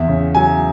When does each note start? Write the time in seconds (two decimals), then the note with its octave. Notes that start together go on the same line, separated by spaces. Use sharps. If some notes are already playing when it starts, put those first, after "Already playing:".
Already playing: E2 E5
0.08 C#3
0.35 F#3 G#5